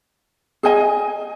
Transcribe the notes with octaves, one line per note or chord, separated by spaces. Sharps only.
G#4 D#5 G#5